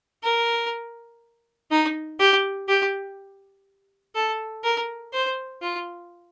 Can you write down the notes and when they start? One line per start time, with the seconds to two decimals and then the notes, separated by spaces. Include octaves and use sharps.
0.24 A#4
1.71 D#4
2.20 G4
2.68 G4
4.15 A4
4.64 A#4
5.13 C5
5.62 F4